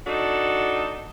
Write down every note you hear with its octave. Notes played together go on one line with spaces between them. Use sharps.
D4 D#4 F#4 A4